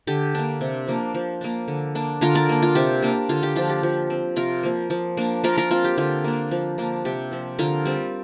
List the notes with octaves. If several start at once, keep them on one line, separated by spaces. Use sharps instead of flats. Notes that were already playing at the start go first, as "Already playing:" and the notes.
D3 G4
A#3 D4
C3
F3 A#3 D4
F3
A#3 D4
D3
A#3 D4
D3 F4 A#4
A#4 D5
A#3 D4
F4
C3 G4
A#3 D4
D3 F4
G4
F3 D4 F4
G4
F3
C4
C3 F4 A#4
F3 A#3
F3
A#3 D4
F3 F4 A#4
F4 A#4
C4 F4
G4
D3 F4
A#3 D4
F3
A#3 D4
C3 G4
F3 C4
D3 F4 A#4
G3 C4